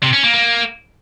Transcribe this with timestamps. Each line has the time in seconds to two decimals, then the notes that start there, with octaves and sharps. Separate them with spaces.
0.03 C3
0.13 C#4
0.24 A#3
0.34 A#3